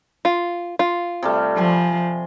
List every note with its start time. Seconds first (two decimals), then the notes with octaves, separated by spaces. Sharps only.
0.25 F4
0.79 F4
1.23 C3 G3 A3
1.57 F3 G#5 C6